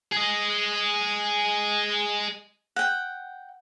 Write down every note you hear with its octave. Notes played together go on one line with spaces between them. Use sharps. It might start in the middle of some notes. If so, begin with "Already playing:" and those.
G#4 D#5
F#5 G5